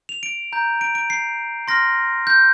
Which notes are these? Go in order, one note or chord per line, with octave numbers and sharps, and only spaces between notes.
F7
D7
A#5 G6
D7
D7
C7
C6 F6 A#6
G6